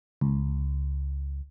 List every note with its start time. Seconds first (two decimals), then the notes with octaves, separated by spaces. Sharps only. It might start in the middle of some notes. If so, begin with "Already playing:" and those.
0.21 C#2